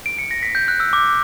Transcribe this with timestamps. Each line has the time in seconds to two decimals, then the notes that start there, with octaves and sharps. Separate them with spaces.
0.06 D7
0.19 C#7
0.31 A#6
0.43 B6
0.55 G6
0.68 F#6
0.80 E6
0.93 D6